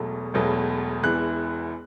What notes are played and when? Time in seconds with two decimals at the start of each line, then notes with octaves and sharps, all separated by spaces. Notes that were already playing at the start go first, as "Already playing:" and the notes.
Already playing: E1 E2 B2 F#3 A3
0.34 E1 E2 B2 F#3 A3
1.03 E1 E2 E3 F#6